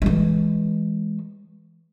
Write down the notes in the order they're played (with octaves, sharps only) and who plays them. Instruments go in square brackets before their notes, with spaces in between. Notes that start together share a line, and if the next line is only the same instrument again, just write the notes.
[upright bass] E3 G#3